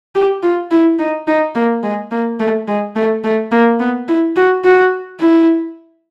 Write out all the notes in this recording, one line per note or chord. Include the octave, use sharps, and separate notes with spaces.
G4
F4
E4
D#4
D#4
A#3
G#3
A#3
A3
G#3
A3
A3
A#3
B3
E4
F#4
F#4
E4